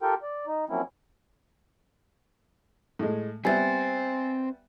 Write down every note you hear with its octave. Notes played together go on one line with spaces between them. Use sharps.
F4 G4 A4 A#4 G5
D5
D#4
F3 F#3 A#3 C4 C#4 E4
A2 G#3
G3 B3 C4 C5 E5 G#5 A6